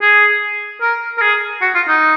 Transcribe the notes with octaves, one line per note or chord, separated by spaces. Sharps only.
G#4
A#4
A#4
G#4
F#4
F4
D#4